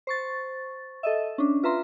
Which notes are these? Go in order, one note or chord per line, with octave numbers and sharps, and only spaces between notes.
C5 C#6 A6
A4 D#5 E5
C#4 D4
F4 B4 E5 A#5 C6